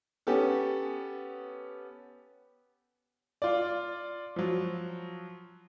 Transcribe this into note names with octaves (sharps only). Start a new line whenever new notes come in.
B3 C#4 G4 A4
F4 D5
F3 F#3